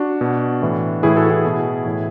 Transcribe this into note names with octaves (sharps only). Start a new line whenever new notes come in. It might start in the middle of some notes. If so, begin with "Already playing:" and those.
Already playing: D4 F#4
B2
A2 E3
A2 E3 E4 G#4
F#4 A4
E4 G#4
B2
A2 E3